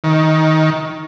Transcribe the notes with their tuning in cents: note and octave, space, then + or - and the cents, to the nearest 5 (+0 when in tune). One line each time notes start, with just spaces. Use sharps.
D#3 +15